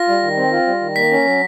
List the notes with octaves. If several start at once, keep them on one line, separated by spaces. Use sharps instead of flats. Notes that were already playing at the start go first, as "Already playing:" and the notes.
Already playing: F4 A#6
G3
D#3
C4
F4
G3
D#3
A#3 B6
C#4
F#3